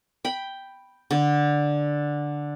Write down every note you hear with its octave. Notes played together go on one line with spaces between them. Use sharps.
G5 B5
D3